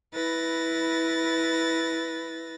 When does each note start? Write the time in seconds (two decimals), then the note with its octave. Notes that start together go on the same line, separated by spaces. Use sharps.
0.12 E4 B4 A6 A#6